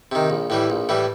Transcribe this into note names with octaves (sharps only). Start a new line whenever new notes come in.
C3 D#3
A#1
A2 E3 G3
A#1
A2 E3 G3